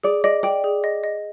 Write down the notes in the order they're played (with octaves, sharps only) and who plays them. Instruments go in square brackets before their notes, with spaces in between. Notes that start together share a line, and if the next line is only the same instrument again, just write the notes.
[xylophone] G#4 [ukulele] D5
[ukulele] D5 [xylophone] D#5
[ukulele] D5 [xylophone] G5
[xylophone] G#4
D#5
D#5